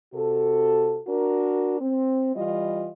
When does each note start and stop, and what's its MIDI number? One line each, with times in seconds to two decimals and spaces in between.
0.14 1.00 48
0.14 1.00 66
0.14 1.00 69
1.07 1.76 62
1.07 1.76 66
1.07 1.76 70
1.81 2.34 60
2.35 2.89 52
2.35 2.89 55
2.35 2.89 65
2.35 2.89 75